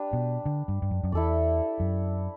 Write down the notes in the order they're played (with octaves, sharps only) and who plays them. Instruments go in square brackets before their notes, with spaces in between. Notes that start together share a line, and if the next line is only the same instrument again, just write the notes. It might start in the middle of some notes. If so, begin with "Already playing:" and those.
Already playing: [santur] D4 G4 B4
[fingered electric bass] B2
D3
G2
G2
F#2
F#2
[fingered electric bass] E2 [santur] E4 A4 D5
[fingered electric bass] F#2